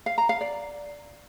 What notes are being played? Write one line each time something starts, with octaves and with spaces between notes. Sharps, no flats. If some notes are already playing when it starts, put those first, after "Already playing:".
F5
A#5
F5
D5